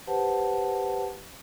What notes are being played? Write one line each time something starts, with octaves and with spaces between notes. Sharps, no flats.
G4 B4 C5 F#5 A5